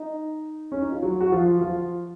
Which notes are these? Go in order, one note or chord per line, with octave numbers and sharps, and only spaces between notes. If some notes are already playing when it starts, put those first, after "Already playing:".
Already playing: D#4 D#5
C#4
D#4
F4
F#3 F#4
F#4
F3 F4
F3 F4